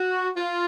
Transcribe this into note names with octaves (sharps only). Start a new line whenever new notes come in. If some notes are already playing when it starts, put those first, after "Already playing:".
Already playing: F#4
F4